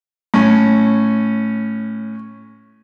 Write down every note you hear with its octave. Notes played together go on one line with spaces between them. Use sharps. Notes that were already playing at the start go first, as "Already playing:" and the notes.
A2 C#4